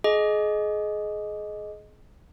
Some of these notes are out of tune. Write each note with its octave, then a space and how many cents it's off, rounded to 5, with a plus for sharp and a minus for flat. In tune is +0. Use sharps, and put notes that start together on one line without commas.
G#4 +30 D#5 +0